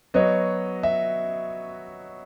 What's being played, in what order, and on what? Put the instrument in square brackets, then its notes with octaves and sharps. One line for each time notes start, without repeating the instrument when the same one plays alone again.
[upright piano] F#3 B3 F#4 C#5 [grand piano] D#5
[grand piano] E5